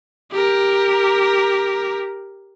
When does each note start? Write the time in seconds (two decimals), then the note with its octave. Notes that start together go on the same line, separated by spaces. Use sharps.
0.32 G4 A#4